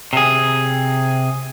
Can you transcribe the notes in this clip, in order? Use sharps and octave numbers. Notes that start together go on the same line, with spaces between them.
C3 G#4